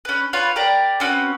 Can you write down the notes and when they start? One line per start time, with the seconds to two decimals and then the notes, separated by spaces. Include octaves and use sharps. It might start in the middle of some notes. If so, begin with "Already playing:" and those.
0.05 C#4 B4
0.33 F4 B4 C#5 F5
0.56 G4 A#4 D5 A#5
1.00 C4 C#4 F#4 B4